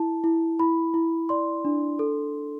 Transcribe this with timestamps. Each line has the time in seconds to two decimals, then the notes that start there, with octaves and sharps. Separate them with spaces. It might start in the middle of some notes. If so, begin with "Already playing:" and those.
Already playing: E4 A5
0.24 E4
0.59 E4 B5
0.94 E4
1.29 D5 C6
1.65 D4
1.99 A4